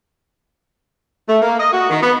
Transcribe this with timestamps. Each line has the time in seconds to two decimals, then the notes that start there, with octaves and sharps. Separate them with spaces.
1.29 A3
1.41 A#3
1.58 D#5
1.73 F#4
1.90 D#3
2.03 B3